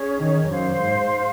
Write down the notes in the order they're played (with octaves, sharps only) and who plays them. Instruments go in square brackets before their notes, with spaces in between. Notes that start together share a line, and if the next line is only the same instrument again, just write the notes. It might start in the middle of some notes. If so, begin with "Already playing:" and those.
Already playing: [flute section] C#4 G#4 C#5
[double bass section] D#3
[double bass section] F#2 [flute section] C5 F5 C6
[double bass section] G#2